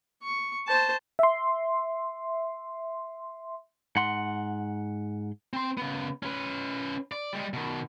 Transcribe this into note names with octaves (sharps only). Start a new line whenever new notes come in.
C#6
C5 A5
E5 C6
G#2 F#5 C6
C4 C6
C#3 B3
C#4 B4
D5
G3 G#3
B2 D#3